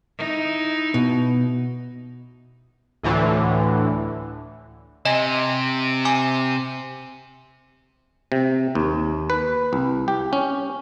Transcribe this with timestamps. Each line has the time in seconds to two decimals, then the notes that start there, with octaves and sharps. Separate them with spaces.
0.18 D#4 E4
0.94 B2
3.03 D2 A2 D3 E3
5.05 C3 D#5 G#5
6.05 G#5 D6
8.32 C3
8.75 D#2
9.30 B4
9.73 C2
10.08 G4
10.33 C#4